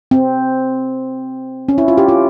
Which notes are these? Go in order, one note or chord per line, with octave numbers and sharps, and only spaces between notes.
C4
C#4
E4
F4
G4
F4